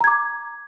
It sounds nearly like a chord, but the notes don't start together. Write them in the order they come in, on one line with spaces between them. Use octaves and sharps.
A#5 G#6 D6